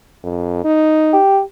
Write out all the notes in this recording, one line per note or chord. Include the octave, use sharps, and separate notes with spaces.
F2
D#4
G4